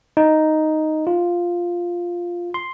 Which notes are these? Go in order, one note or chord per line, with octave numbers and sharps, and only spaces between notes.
D#4
F4
C6